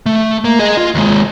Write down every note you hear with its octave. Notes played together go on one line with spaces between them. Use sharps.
A3
A#3
G#4 D#5
F4
D#2 G#3